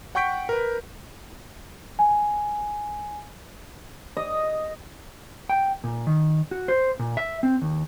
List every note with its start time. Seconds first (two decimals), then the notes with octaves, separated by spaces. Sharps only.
0.15 F#5 G5 C#6 G6 B6 D7
0.49 A#4 B4
1.99 G#5
4.17 D#5
5.49 G5
5.84 A#2
6.07 D#3
6.51 F#4
6.68 C5
6.99 A#2
7.17 E5
7.43 C4
7.62 D#2